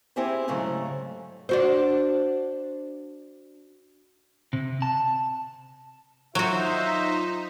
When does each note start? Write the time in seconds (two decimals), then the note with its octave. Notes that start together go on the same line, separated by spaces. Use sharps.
0.16 C4 E4 G4 G#4 C5
0.48 G#2 C#3 F#3 A3
1.49 D4 F#4 C5
4.53 C3
4.82 A5
6.35 F#3 D#4 F4 F#4 C5 E5